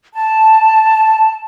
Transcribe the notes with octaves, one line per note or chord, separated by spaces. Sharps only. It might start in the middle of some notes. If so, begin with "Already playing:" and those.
A5